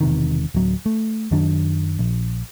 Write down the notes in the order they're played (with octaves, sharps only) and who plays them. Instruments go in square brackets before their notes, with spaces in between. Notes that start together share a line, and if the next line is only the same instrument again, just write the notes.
[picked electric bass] E1 C3 D#3
D1 F#3
A3
F#2 D#3 F#3 D4
A#1